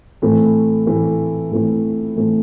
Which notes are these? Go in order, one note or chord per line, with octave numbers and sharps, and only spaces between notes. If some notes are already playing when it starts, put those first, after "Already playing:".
A2 E3 A3 C4 E4
A2 E3 A3 C4 E4
A2 E3 A3 C4 E4
A2 E3 A3 C4 E4